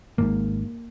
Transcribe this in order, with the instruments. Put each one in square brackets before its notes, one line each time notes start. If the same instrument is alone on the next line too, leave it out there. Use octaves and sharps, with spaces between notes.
[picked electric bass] G#1 G#2 A#3